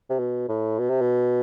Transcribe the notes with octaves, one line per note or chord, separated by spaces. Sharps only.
C3
B2
A2
B2
C3
B2